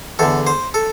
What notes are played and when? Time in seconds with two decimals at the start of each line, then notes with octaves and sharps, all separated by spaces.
0.19 E2 D3 A4
0.47 C5
0.74 A4